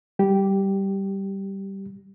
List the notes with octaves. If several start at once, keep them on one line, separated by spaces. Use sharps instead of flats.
G3 G4